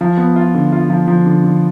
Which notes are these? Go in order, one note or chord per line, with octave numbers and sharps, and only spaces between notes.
F3
B3
F4
D3
F4
F3
F3
D3
D3